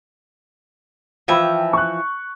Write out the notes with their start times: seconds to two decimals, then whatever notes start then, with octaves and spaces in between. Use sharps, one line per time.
1.28 E3 F3 F4 E5 G5 B5
1.73 C#6 F#6